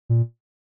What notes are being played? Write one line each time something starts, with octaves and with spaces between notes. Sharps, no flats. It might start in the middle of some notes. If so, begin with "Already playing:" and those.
A#2